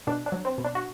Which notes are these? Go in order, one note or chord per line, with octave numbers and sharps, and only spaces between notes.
B2 D4
D4
F#3
C4
B2
D4
F#4